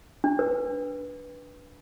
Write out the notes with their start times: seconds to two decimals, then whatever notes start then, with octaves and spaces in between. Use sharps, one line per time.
0.24 D4
0.39 B4